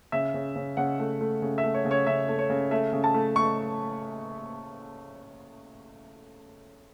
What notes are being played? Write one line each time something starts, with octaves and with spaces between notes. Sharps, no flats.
C#3 E5
C#3
C#3
C#3 F#5
A3
A3
C#3
E5
A3
C#5
C#3
C#5
C#3 E5
A3
C#5
C#3
A3 E5
C#3
A5
A3
A3 C#6